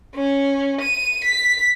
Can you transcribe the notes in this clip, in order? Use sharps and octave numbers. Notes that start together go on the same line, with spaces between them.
C#4
D#7
B6